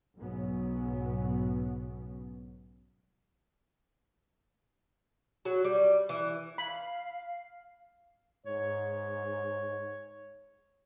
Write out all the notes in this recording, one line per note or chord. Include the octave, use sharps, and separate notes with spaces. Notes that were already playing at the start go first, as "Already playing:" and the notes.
B1 G#2 B2 F#3 B3 C#4
F#3
G3
E3
F5 B5
G#2 C#5